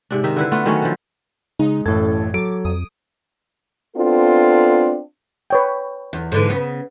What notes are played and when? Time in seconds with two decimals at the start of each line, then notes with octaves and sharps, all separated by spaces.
0.11 G#2 C3 D4
0.24 D#3 D#4 E5
0.36 D3 E4 B4
0.52 A3 B3 F4
0.65 D#3 F#3 A3 C#4
0.82 D3 F3
1.59 C#3 G#3 D#4
1.86 A1 F#2 A2 A4 G#6
2.34 F#3 A4 D6 D7
2.65 F2 D#6
3.97 B3 C4 D4 F4 A4
5.50 B4 C#5 G5
6.13 E2
6.32 G#2 D3 E3
6.50 C#3 B3